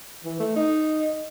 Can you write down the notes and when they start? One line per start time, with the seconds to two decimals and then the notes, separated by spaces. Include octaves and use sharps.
0.24 E3
0.39 A3
0.56 D#4